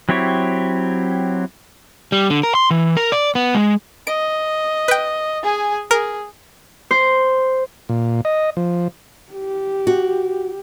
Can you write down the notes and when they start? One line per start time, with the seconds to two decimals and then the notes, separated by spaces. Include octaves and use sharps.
0.09 F#3 C4 E4 G4 C#5
2.12 G3
2.30 D3
2.43 A#4
2.55 C6
2.71 E3
2.97 A#4
3.12 D5
3.35 B3
3.55 G#3
4.07 D#5 D7
4.88 B4 G5
5.42 G#4 G#5
5.91 G#4 A#4
6.91 C5
7.89 A#2
8.25 D#5
8.57 F3
9.33 G4
9.87 F#4